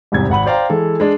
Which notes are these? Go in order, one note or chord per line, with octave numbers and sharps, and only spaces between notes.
E2 G#2 C3 G3 G#6
G#1 F#5 B5 F#7
C5 D5 F5 G5 A#5
E3 G#3 A4
G#3 D4